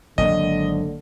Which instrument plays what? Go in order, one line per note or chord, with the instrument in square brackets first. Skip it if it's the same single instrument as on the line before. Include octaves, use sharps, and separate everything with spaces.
[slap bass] G#1 F#3 A#3 [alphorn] D3 [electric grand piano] D#5